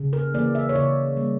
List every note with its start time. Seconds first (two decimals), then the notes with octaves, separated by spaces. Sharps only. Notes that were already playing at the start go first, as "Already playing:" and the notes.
Already playing: C#3
0.13 A#4
0.34 E3 A#3 D5
0.55 E5
0.69 C#5
0.76 C#3 D5
1.17 G3 A#3